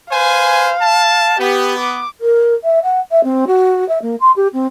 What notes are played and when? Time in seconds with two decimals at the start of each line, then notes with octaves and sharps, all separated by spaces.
0.12 B4 C5 F5 G#5
0.81 A5
1.39 B3 G4
1.79 D6
2.21 A#4
2.64 E5
2.83 F#5
3.11 E5
3.24 C4
3.47 F#4
3.89 E5
4.02 A#3
4.20 C6
4.36 G4
4.53 C4